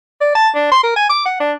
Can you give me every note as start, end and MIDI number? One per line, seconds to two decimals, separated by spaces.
0.21 0.33 74
0.35 0.48 81
0.55 0.71 62
0.72 0.79 84
0.83 0.93 70
0.96 1.07 80
1.10 1.24 86
1.26 1.37 78
1.40 1.53 62